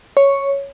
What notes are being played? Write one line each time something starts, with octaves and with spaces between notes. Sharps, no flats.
C#5